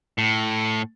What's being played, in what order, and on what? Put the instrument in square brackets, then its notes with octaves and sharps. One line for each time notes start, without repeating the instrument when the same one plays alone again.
[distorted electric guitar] A2